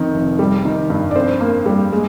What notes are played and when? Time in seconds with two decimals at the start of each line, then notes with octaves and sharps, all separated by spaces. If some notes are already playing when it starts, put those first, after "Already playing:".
Already playing: F2 D#3
0.14 F1
0.39 G3
0.65 D#3
0.90 G2
1.11 D5
1.15 F2 C5
1.41 A#3
1.66 G3
1.92 G#3